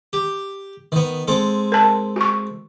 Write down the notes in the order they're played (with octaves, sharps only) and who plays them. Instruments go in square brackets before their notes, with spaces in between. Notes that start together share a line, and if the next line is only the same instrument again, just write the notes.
[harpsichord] G4
D#3 B3
G#3 C4 A4
[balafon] A#4 A5
F#4 C#6